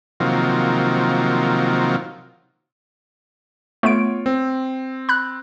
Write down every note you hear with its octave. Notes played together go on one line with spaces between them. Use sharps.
C3 D#3 F3 F#3 A#3
A3 B3 F4 C#5 D7
C4
B5 F#6